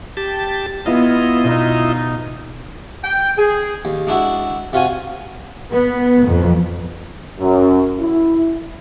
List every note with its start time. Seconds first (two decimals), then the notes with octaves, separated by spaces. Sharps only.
0.17 G4 A5
0.86 B3 E4 F4 D#5
1.44 B2 D#4
3.04 G5
3.37 G#4
3.85 D#2
4.07 G#3 D4 E4 F#4
4.73 C3 F4 F#4 G#5
5.71 B3
6.24 F2
7.38 F#2
8.00 E4